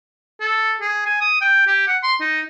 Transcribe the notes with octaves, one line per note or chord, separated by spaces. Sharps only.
A4
G#4
G#5
D#6
G5
G4
F#5
C6
D#4